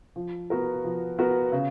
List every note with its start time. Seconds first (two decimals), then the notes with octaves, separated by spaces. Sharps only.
0.16 F3
0.50 B3 F#4 A#4
0.85 F3
1.19 B3 F#4 A#4
1.52 C#3